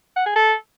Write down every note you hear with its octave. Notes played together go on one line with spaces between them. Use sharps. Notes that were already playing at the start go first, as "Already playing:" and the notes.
F#5
G#4
A4